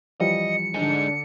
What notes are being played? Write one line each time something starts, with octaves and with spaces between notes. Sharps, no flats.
E3 F3 G3 D#5 C#7
D3 G#3 D4 D#4